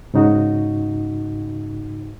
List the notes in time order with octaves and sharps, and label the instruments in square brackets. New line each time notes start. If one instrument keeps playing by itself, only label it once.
[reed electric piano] G#2 C#3 D#4 F#4